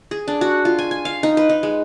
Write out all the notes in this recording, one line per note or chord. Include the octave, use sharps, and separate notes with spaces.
G#4
D4
F#4
F4
G#5
G#5
F5
D#4
B4
D#4
G#3